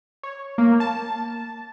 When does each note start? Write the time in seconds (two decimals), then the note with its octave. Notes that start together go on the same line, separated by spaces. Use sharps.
0.23 C#5
0.58 A#3
0.80 A5